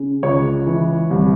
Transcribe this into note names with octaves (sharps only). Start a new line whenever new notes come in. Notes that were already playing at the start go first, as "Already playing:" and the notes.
Already playing: C#3
C#2 C#5
E3
C2